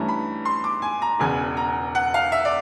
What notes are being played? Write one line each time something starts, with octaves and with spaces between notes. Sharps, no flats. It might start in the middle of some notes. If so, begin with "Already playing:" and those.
Already playing: G2 E3 A3 C#4 A#5
B5
C6
D6
G#5
A#5
E1 E2 C#3 G#5
A#5
F#5
F5
E5
D5